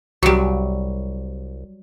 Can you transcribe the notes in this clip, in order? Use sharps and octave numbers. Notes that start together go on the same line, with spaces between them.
C2 F#3 G3 F#4 G4